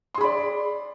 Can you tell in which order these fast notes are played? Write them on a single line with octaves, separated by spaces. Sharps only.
C6 G#4 B5 D5